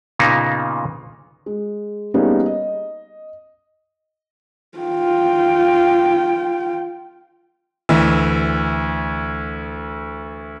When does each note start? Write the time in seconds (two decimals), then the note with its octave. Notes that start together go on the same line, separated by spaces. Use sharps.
0.19 A#2 C#3 A#3 B3 D#4
1.46 G#3
2.14 G3 A#3 B3 C#4 D#4 G#4
2.46 D#5
4.78 F4 G5
7.89 D2 E3